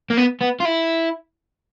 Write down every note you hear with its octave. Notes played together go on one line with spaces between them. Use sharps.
A#3
B3
B3
F4
E4